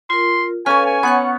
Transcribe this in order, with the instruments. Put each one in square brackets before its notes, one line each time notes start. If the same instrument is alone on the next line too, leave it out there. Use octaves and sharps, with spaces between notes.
[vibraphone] F4 A#4 [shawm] C6
[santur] C#4 C#5 [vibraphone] A4 B4 F5 [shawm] G#5
[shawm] G#5
[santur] B3 [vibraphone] C#5 F#5 C#6